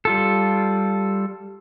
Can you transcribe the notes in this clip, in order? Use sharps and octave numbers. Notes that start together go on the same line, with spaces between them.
G3 F4 A4